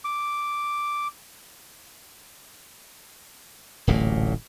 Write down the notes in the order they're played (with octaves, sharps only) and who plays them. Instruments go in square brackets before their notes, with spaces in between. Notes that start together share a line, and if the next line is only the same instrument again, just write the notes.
[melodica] D6
[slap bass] D1 A1 A#2